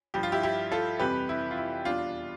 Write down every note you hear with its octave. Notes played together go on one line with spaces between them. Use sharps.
G2 F3 G4
F4
E4 G4
E4 G4
F4 A4
F2 C3 E3 G3 G4 B4
E4
F4
E4
E2 B2 G3 D4 F4